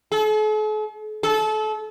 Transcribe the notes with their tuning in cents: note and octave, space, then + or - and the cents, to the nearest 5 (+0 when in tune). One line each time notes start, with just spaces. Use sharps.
A4 -45
A4 -30